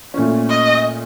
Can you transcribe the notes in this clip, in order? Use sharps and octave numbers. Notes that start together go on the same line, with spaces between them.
A#2 A3 C#4
D#5